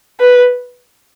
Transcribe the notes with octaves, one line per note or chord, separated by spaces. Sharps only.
B4